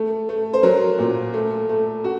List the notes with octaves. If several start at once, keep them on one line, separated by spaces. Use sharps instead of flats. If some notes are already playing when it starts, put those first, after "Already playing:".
Already playing: A3
A3
C5
F#3 A#4
A#2
A3
A3
F#4